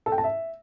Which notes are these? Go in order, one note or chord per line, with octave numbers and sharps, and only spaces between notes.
A4
G5
A5
E5